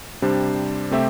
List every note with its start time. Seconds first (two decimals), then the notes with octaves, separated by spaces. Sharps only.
0.22 C3 G3 D4 C5
0.91 C3 A3 C4 G4 E5